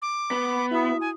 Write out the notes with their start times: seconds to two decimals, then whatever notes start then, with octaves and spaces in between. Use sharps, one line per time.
0.02 D6
0.31 B3
0.71 E4 F#4 E5 D#6
1.01 G#5